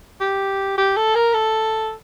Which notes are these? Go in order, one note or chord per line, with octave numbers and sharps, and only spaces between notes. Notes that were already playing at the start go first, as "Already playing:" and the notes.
G4
G4
A4
A#4
A4